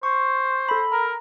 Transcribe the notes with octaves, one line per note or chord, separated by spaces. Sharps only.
C5 C#6
A4 B5
A#4 A#5